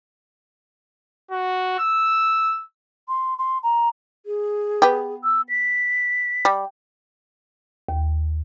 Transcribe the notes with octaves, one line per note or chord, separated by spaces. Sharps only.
F#4
E6
C6
C6
A#5
G#4
B3 G4
E6
B6
G3
D#2